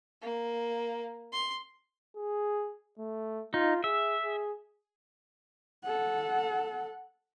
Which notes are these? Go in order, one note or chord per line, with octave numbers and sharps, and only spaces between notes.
A#3
C6
G#4
A3
D#4 F4
G#4 E5
G#4
A4 F#5